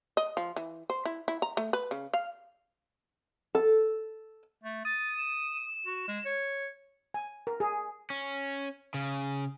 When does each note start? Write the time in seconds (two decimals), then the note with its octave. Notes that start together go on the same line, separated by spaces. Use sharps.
0.17 D#5
0.37 F3
0.56 E3
0.90 C5
1.05 E4
1.28 E4
1.42 A#5
1.57 A3
1.73 B4
1.91 C#3
2.14 F5
3.55 A4
4.64 A3
4.85 D#6 A6
5.17 E7
5.86 F#4
6.08 G#3
6.25 C#5
7.14 G#5
7.47 A#4
7.60 G#4
8.10 C#4
8.94 C#3